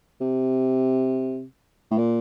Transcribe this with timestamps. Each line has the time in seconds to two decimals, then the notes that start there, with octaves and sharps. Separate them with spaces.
0.21 C3
1.91 A2
1.97 A#2